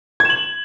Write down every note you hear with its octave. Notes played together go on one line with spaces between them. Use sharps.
G#6 E7 F#7